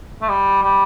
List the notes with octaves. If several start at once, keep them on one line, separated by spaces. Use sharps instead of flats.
A3
G3
G3